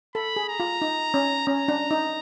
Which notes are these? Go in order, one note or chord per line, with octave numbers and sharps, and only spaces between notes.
A4 B5
G#4
A#5
F4
D#4
C#4
C#4 A#5
D4
D#4